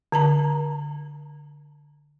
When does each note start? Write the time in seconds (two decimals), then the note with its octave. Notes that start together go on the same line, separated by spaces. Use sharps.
0.12 D3 A5 A#5